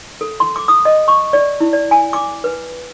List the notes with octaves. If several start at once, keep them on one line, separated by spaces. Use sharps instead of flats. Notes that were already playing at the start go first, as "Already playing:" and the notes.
A4
C6
D6
D#6
D#5
C#6
D5
E4
D5
G#5
D6
B4